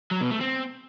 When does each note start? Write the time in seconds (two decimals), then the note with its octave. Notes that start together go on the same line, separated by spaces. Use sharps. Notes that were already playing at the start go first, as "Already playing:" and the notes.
0.11 F#3
0.21 B2
0.31 A3
0.41 C4